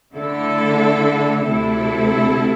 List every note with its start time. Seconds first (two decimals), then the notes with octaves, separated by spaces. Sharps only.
0.15 D3 A3 E4 A4
1.46 D2 C3 A3 E4 A4